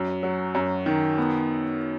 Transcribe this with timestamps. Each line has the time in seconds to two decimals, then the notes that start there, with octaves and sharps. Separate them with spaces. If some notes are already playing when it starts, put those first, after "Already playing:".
Already playing: F#2
0.23 F#3
0.55 F#2
0.86 D#3
1.18 B3